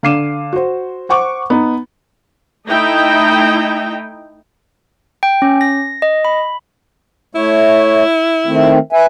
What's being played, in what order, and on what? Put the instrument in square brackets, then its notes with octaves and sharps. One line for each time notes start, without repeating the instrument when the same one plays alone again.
[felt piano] D3 F5 D6 C7 D#7 E7
F#4 C5
C5 F#5 C#6 D6
B3 D#4
[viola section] A3 D#4 E4 D#5 G5
[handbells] G5
C#4
A#6
D#5
B5
[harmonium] A3 C#5 [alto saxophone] E4
[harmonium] D#3 A3 C4
B4 E5 G#5